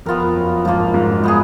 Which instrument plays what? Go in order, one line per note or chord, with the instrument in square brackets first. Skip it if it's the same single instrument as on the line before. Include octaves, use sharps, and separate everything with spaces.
[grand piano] F2 [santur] B3 F4 A#4
[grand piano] F#2
[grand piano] G#2 [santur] F3 A#3 F4
[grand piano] F#2
G#2
F#2
[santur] B3 D#4 G#4